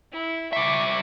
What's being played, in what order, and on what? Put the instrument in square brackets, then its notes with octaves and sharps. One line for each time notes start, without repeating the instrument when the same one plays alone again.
[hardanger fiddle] E4
[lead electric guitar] G3 E5 [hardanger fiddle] C#6 D6